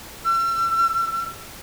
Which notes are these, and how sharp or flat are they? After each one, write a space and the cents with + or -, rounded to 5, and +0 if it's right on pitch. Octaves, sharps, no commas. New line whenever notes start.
E6 +40